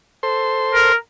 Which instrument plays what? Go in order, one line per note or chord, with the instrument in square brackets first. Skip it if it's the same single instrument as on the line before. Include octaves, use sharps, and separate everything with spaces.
[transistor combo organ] A4 C5 C6
[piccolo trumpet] A#4